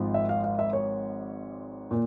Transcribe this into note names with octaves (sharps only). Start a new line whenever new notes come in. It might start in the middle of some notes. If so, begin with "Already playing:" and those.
Already playing: G#1 G#2 F3
E5
F5
F5
E5
C#5
A#2